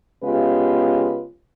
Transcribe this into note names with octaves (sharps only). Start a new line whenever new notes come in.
C#3 G#3 B3 F4 G4 B4